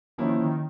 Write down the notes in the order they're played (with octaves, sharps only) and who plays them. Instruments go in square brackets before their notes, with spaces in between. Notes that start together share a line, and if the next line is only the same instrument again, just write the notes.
[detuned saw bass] D#3 [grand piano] F3 A#3 C#4 E4
[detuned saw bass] D#3